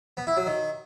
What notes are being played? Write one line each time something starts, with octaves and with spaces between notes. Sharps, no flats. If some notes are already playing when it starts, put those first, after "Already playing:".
B3
E4
F#3
D#3